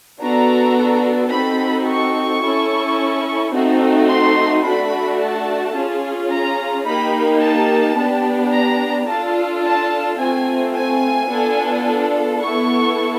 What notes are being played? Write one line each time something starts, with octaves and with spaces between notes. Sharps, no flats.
B3 D4 F#4 A4 A#5
C4 D#4 F#4 A4 B5
C#6
C#4 E4 A4
A3 C4 D#4 F#4 A4
C6
A3 D4 F#4 B5
A5
C#4 F4 G#4
A#5
A#3 D#4 G4 B5
A5
B3 D4 G4
A#5
D4 F4 A4 A5
A5
A3 C4 F4 G#5
G#5
B3 D4 F4 A4
B3 E4 A4 C#6